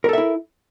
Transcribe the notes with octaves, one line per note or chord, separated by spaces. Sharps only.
E4 A4 A#4 E5